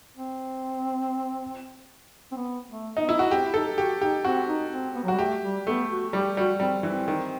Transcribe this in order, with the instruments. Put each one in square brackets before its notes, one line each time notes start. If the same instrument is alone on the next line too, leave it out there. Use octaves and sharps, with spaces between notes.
[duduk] C4
C4
B3
A3
[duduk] B3 [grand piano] D#4
[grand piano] E4
F#4
[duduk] C4 [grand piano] G4
[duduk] E4
[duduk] D#4 [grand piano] A4
[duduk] F#4 [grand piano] G4
[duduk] D#4 [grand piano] G4
[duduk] C4 [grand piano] F#4
[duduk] D#4
C4
B3
F#3
[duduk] G3 [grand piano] F#4
[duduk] A3 [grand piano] G4
[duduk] G3
[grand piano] A3 [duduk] B3
[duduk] F#4
[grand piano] G3 [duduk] G4
[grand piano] G3 [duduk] F#4
[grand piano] G3 [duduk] C4
[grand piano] E3 [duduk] C4
[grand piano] D#3